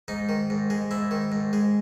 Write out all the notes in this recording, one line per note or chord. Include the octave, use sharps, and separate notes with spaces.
G#2 D#4
D#3
G#2
G#3
G#2 E4
D#3
G#2
G#3